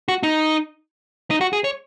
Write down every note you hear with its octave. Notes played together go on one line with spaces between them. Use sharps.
F#4
D#4
D#4
F#4
G#4
C#5